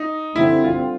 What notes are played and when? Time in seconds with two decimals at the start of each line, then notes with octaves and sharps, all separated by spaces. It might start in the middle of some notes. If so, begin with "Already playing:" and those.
Already playing: D#4
0.36 D3 G3 C4 E4
0.64 F4